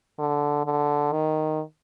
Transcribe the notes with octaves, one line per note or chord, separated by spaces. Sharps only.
D3
D3
D#3